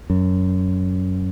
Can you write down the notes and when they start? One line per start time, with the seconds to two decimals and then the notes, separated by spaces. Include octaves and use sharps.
0.10 F#2